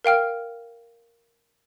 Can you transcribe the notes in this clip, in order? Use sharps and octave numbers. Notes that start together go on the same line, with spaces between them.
A#4 F5 G5 F6